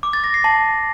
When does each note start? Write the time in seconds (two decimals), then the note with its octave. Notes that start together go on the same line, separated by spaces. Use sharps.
0.03 D6
0.13 A6
0.24 A#6
0.34 C7
0.44 A5